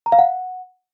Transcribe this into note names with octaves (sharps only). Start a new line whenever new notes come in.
A#5
F5
F#5